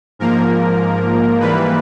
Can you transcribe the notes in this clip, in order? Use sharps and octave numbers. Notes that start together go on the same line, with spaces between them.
G#2 F3 A#3 A#4
G#2 E3 G3 A#3 B4